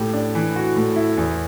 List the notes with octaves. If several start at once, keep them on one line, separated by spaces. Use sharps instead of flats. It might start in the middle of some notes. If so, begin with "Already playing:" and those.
Already playing: A2 G4
D4
E3
F#4
A2
E4
E2